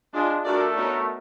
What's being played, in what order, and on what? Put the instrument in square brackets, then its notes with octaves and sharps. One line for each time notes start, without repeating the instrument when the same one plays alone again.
[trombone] G#3 [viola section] D4 F4 G#4
[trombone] A3 [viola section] D4 F#4 A#4 D5
[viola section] B3 D#4 F#4 A#4 C#5